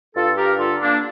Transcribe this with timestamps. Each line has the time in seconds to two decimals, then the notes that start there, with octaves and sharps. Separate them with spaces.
0.15 G2 F4 A4
0.37 G4 A#4
0.59 D3 F4 A4
0.81 A#3 D4